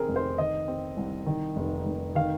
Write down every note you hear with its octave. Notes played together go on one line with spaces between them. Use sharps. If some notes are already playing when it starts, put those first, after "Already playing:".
Already playing: D#3 C4 G#4 A#4
F1
C5
D#3 D#5
C4
C2
D#3
F1
F1
D#3 F5